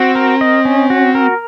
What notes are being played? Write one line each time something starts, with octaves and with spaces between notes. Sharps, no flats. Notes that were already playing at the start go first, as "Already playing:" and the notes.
Already playing: C4 F#4
A#4
D#5
C#4
F#4
A#4